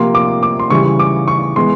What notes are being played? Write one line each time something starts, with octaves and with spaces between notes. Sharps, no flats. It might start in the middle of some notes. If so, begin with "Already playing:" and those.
Already playing: C3 F3 A#3 C6
D6
D6
C6
C#3 E3 G3 C#6
D6
C#6
E3 G#3 B3 C6